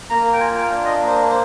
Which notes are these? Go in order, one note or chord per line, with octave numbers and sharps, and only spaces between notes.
A#3 A#5
G5
F4 G#5
G5
F5
D4
D#5
A#3
C5
C5